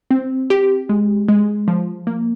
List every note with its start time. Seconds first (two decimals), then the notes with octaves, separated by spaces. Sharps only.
0.11 C4
0.50 G4
0.89 G#3
1.29 G#3
1.68 F3
2.07 A#3